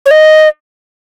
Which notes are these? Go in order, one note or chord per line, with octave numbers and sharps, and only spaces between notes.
C#5
D#5